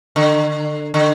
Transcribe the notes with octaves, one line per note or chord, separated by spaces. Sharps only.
D3
D3